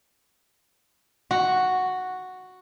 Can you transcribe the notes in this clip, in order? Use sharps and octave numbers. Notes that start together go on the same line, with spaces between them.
F#4